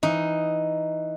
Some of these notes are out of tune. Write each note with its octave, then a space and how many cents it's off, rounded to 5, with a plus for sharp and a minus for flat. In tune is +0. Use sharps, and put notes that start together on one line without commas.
E3 +0 D#4 +0